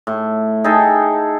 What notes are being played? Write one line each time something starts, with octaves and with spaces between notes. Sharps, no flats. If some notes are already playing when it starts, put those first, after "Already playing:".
A2
D#4 G#4 A4 G5